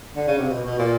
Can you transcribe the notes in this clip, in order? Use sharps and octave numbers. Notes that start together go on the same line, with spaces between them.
D3
C#3
C3
B2
B2
A#2